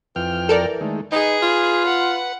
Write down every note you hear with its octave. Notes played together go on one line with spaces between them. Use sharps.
F2 E3 G5 F6
A4 A#4 D5
D#3 G#3 A3
D#4 G#4 B4
F4
F#5